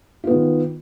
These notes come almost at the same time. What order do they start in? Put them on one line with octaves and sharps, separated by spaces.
F4 B3 D#3